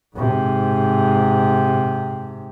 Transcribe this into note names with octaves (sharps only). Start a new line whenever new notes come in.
G#2 C3